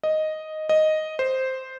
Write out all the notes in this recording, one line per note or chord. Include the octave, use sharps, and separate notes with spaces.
D#5
D#5
C5